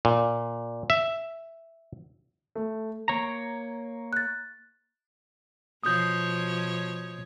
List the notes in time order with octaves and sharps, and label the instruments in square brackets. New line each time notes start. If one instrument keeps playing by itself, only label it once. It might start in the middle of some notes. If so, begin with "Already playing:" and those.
[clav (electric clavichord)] A#2
E5
[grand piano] A3
[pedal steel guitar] A#3 C#5 A#5
[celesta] F#6 A6
[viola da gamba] B2 F3 C#5 [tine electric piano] D#6 G6